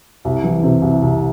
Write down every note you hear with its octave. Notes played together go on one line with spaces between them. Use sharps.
C2
E3
C3
C2
C2